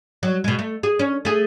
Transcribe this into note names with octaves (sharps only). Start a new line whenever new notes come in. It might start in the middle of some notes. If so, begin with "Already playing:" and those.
F#3
B2 G#3
A3
G#4
C#4
A3 G#4